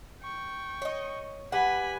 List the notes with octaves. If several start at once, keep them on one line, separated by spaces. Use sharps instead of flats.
G5 C#6
C#5 D#5
G3 B4 F#5 G#5 B5